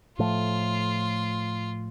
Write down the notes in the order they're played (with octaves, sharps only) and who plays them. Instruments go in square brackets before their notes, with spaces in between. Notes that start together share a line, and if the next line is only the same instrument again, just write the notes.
[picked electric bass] A2 F3 A3 [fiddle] F4